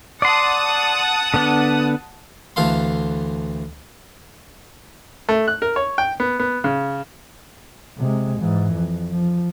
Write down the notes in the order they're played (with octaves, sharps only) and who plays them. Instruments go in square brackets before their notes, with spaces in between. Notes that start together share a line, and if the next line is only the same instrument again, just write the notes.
[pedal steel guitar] D5 C6 [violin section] F#5 A5 D#6
[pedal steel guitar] D3 B3 D4
[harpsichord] D2 E3 A4 F5 C6
[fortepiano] A3
F#6
A#4
C#5
G5
B3
B3
C#3
[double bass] C3 G#3
G#2 E3
F2
F3